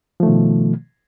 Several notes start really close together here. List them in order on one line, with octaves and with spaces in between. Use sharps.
F3 A3 D#3 B2